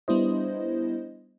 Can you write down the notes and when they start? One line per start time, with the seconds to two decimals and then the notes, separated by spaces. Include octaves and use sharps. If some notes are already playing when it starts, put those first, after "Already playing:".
0.08 G3 B3 D4 E4 C5 D#5